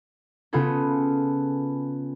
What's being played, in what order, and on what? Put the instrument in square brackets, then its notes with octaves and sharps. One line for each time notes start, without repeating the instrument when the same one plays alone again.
[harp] C#3 B3 F4 G#4 A4